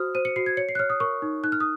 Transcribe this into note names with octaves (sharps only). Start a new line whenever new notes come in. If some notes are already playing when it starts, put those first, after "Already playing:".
Already playing: F#4 C5 D#6 F6
C5 D#7
C#7
F#4 C7
G#6
C#5 C#7
C7
F#6
C#5 F6
D#6
A#4 C#6
D#4
D#4 F#6
F6
D#6